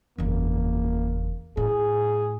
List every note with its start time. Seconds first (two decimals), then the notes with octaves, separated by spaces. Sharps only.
0.18 F#1 E2 A#3
1.57 A2 G#4